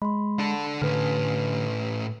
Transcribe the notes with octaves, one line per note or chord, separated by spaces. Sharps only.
G#3 B5 C6
D4 A4
A2 D3 C#4 B4 F6